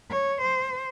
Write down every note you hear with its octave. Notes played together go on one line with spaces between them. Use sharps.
C#5
C5